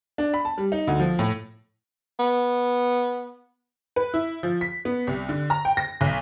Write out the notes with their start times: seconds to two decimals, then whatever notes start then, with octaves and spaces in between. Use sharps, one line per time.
0.18 D4
0.34 B5
0.45 A5
0.58 G3
0.72 D#4
0.87 D2
1.00 F3
1.19 A2
2.19 B3
3.96 B4
4.14 E4
4.43 F3
4.61 B6
4.85 B3
5.07 C2
5.29 D3
5.50 A#5
5.65 G5
5.77 A#6
6.01 B1